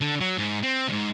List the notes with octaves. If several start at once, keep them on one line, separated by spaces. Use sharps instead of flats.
D3
F#3
G#2
C4
D2 G#2